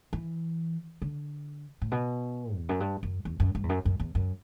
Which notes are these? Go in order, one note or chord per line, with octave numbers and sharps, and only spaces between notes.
E3
D3
A2
B2
E2
F#2
G2
F#2
E2
F#2
G2
E2
F#2
F#2
E2
F#2